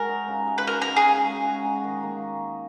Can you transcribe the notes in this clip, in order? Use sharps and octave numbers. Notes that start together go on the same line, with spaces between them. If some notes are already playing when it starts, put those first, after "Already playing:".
Already playing: G#3 F#4 A#4
D#4
C#3
G#3
B4
F#4 A#4
A#4
D#4
G#4
C#3
G#3
F#4
D#4
D#3
A#3